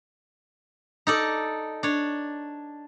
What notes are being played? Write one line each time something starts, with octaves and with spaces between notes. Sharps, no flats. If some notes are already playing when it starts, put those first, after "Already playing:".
D#4 A4 D5
D4 C#5